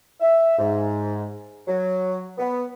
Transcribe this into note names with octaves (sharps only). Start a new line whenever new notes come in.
E5
G#2
F#3
B3